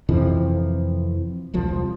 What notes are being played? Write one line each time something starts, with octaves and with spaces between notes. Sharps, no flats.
F2 C3 E3 F3
E1 C2 F3